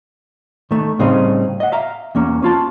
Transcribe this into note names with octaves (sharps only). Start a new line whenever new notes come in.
D#3 A3
A2 C#3 G3 C4 D#4
D#5 F#5
E5 F5 A#5
E2 A#3 C#4
C#4 F4 A5